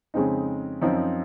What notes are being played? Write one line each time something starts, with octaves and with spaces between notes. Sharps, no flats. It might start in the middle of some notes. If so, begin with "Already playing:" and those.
F2 C#3 G#3 C4 D#4
F#2 F3 C4 D#4